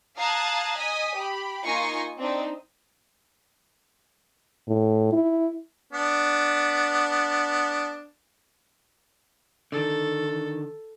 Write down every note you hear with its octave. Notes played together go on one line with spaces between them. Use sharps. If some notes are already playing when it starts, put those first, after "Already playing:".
F5 A5 A#5 D#6 F#6 G#6
D#5 G#5 D#6 B6
G4 B5
A#3 D#4 F4 G#5 C#6 A#6
C4 D4 D#4
A2
E4
B3 D4
D3 D#3 A4